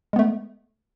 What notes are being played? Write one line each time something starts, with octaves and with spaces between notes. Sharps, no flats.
G#3 A3 B3